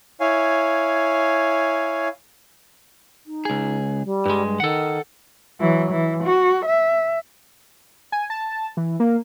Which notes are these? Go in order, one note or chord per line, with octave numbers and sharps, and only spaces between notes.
E4 C#5 F5 G#5
D#4
C#2 G#4
G3
G2 G#3
D#3 A4 F#5
E3 F#3
E3
F#4
E5
G#5
A5
E3
A#3